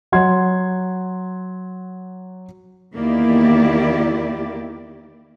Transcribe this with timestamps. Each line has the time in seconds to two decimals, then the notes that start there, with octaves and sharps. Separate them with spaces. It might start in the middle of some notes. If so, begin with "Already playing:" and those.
0.12 F#3 F#5 C6 G#6
2.95 E2 D#3 A#3 E4 G4 D5